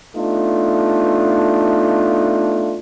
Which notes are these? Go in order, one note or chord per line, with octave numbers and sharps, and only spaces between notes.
A3 B3 D4 D#4 F4